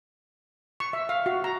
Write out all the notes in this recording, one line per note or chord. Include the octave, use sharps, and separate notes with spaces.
C#6
E5
F5
F#4
A#5